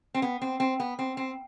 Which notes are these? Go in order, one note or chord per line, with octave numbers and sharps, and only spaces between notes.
C4
B3
C4
C4
B3
C4
C4